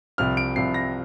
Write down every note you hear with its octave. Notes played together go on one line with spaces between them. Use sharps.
C2 C3 F3 F6
D7
C2 C3 F3 C7
A#6